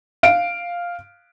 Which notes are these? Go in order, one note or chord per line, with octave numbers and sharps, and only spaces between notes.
F5 D7